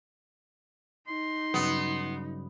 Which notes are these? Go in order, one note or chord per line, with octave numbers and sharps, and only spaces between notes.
D#4 C6
G2 C#3 F#3 B3